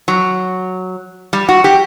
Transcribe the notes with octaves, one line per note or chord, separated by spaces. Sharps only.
F#3
G3
F#4
G4